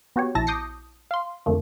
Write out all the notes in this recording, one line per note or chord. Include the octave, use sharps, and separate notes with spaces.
B3 F#4 G4 C#5
A#1 E4 A5 A#6
D6 D#6 G6 A#6 C7 C#7
F5 C6
F2 D3 A3 A#3